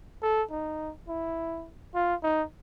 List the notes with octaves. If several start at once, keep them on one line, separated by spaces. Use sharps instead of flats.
A4
D#4
E4
F4
D#4